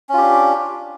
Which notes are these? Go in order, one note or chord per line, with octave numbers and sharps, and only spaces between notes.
C#4 D4 F4 G4